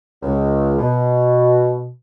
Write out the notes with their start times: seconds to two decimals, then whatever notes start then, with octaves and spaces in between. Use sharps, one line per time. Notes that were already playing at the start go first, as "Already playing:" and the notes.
0.22 C#2
0.78 B2